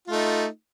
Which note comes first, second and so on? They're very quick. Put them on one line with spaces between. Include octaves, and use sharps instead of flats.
F4 A3 D#4